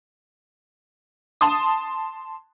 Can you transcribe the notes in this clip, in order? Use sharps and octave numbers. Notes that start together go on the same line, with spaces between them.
A5 C6 D#6